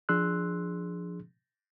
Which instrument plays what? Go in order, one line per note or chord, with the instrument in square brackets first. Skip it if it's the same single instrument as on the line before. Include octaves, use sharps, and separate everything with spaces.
[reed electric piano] F3 D4 G#4 C6 E6 F#6